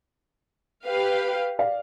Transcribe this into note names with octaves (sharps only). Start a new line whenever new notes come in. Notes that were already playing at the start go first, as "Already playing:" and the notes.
G4 B4 F5
D5 F5